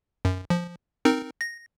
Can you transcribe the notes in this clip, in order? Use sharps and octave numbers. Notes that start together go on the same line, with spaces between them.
F#2
F3
C4 D#4 A#4
A#6